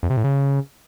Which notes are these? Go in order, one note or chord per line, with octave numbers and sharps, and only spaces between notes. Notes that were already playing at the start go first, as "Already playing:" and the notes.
F2
C3
A2
C#3